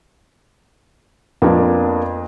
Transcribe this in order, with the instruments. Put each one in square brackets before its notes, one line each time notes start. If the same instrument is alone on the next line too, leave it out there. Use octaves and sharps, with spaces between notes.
[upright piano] F2 [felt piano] A#3 B3 D4